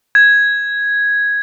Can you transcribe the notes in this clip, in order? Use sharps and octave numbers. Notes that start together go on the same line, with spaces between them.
G#6